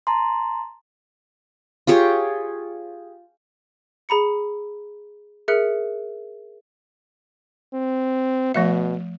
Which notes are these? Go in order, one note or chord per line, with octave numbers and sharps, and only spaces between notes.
A5 A#5 C6
F4 G4 G#4 C#5
G#4 A#5 B5 C#7
G#4 A#4 E5 F#6 C#7
C4
B2 F3 A3 E5